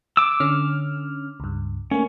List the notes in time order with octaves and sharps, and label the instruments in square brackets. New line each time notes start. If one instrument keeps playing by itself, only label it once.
[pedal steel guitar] D6 E6
[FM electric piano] D3 C#4 F6
C#2 G2
[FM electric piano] A3 A#3 [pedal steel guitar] C#4